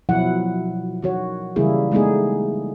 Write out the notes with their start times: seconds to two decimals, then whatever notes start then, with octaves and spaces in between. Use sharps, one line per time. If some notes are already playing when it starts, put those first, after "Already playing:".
0.09 B2 F3 F#3 E4 F#5
1.02 D#3 F#4 C#5
1.56 C#3 E3 G3 A#3 E4 G#4
1.91 G#3 A3 B3 D#4 G#4